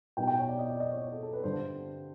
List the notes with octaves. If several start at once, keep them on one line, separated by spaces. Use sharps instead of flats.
B2 G3 B3 D#4 G5
G5
C#5
D5
D#5
D5
D#5
C#5
C#5
A4
A4
B4
G2 D3 G3 C5